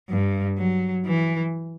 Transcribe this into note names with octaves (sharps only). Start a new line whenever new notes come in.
G2
F#3
E3